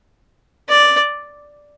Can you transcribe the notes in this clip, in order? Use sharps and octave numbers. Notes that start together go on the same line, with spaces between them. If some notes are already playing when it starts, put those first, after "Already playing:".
D5